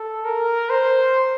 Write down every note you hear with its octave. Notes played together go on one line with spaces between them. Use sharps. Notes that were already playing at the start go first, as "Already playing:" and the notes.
Already playing: A4
A#4
C5